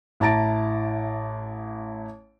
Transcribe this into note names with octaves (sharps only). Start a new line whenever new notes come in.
A1 E4 A5 A#5 A6 D7